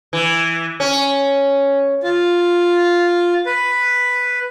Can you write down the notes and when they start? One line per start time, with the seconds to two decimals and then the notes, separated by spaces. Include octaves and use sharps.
0.13 E3
0.80 C#4
2.02 F4
3.46 B4